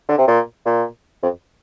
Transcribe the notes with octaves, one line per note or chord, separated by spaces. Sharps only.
D3
C3
A#2
A#2
F2